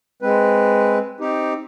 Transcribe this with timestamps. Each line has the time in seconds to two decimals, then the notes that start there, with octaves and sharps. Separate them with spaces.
0.22 G#3 C4 B4
1.20 C4 D#4 G4